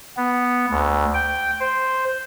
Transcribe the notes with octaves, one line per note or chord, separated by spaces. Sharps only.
B3
D2
G5
C5